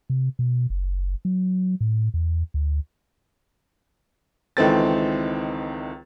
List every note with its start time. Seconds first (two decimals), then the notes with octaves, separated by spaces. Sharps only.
0.10 C3
0.39 B2
0.70 F#1
1.25 F#3
1.81 A2
2.14 E2
2.54 D2
4.57 C#2 D#3 E3 C4 A4 A6